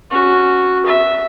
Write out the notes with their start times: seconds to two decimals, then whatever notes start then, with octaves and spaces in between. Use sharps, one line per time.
0.10 C#4 F#4
0.86 E5